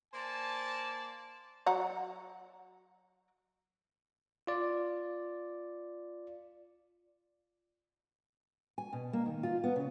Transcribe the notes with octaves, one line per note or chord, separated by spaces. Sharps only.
A#3 C5 D5 G#5 A5
F#3 F#5 A#5
F4 D5
G#5
B2
A#3
D#3
F4
B3
C#3